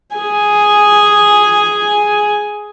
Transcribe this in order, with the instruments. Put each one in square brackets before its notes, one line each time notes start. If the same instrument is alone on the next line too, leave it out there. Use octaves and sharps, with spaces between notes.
[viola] G#4 G#5